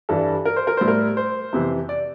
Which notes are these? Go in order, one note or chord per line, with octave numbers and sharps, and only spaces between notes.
G2 E3 G3 A4
A#4
C5
A#4
A2 G3 C5
A#4
C5
F2 C3 E3
D5